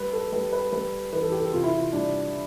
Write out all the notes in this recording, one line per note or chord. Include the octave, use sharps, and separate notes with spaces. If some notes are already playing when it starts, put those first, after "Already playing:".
Already playing: G3 B4
A4
G3 B4
B4
G3 B4
E3 B4
A4
G4
A4
C3 F4
E4
F4
G3 D4